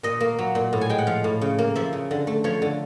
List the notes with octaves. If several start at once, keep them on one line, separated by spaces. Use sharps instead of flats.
A#2 D#5
A#3
F#3
A#2
A2
G#5
G#3 G5
F#5
F3 F5
A2
C#3
A#3
F3 E5
C#3
D3
A3
F3 C#5
D3